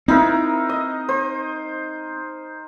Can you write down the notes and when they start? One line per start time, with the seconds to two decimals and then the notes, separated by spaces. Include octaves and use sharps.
0.08 C4 D#4 E4 A#4
0.69 D#5
1.09 C5